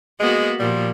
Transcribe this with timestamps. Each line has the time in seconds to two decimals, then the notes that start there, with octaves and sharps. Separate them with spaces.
0.20 G#3 A#3 B3 F#4
0.60 A#2 F3 G3